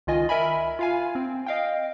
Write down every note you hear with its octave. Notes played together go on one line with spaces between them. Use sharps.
C#2 D#3 F4 D#5 G#5
A#4 E5 G#5 B5
F4 F5 G#5
C4
D#5 F5 G5